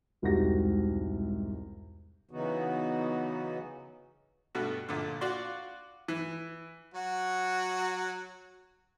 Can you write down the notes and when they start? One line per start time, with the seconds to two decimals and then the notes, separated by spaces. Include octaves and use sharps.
0.22 E1 C2 G#2 F#4 G4 A#6
2.31 C#3 E3 F#3 B3 D#4 F#4
4.55 G2 B2 A3 F#4
4.89 A#1 A#2 D3
5.21 F4 F#4 D5 C6
6.08 E3
6.95 F#3 F#4